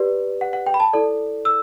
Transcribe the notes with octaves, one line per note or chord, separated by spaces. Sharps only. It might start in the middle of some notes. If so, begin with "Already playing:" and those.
Already playing: G4 B4 D5
F#5
F#5
G5
B5
A5
E4 A4 D5
E6